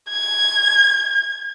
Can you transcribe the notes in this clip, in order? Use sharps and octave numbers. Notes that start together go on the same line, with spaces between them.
G#6